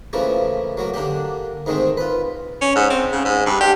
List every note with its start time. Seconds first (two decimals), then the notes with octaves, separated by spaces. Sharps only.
0.13 C#3 E3 F3 A3 A#3
0.77 F#3 A3 A#3
0.94 D3 A#3 D4 G4
1.66 G#2 D#3 G#3 A3 C4
1.97 F4 B4
2.61 C#4
2.75 G#2
2.90 C4
3.12 C#3
3.25 G#2
3.46 G2
3.60 G4